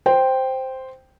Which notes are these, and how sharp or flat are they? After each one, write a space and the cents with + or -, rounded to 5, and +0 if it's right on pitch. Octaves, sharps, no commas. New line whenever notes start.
C5 +0 G5 +0